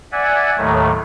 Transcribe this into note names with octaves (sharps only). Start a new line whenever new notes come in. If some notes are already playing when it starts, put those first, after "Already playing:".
D5 E5 F#5 G#5
D#2 A2 D#3 F#3 A3